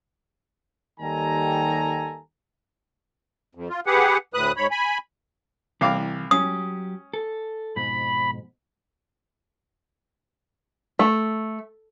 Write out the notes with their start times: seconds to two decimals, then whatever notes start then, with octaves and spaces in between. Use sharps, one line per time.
1.01 D#2 D#3 G3 A4 G#5 A#5
3.55 F2
3.69 F4
3.86 G4 G#4 B4 F#5
4.34 D2 A2 B4 D#6 F#6
4.57 G#2 C#5 B5
4.71 G#5 B5
5.81 C2 E3 F5 D6
6.31 F#3 C#4 G4 D#6
7.14 A4
7.76 F2 G#2 B2 B5
10.99 A3